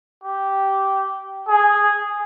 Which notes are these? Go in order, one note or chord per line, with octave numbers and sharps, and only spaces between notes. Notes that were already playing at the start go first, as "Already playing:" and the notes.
G4
G#4